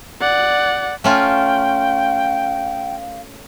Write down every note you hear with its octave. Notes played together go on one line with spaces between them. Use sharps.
D5 F#5
A3 C#4 F4 F5 G5